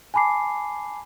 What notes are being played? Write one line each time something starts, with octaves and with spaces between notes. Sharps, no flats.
G#5 A5 B5 D6 C7